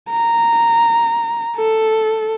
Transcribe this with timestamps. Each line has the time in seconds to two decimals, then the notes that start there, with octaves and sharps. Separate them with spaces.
0.10 A#5
1.57 A4